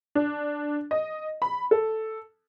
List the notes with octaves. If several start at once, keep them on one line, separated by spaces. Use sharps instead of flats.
D4
D#5
B5
A4